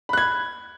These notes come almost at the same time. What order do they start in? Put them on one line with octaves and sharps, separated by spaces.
B5 F#6 G#6